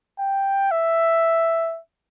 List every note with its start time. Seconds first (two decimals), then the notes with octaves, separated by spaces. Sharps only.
0.19 G5
0.71 E5